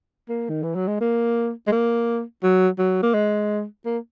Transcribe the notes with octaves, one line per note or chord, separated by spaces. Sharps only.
A#3
D#3
E3
F#3
G#3
A#3
G#3
A#3
F#3
F#3
A#3
G#3
A#3